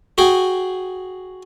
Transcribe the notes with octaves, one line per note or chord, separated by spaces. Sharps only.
F#4 G#4 G5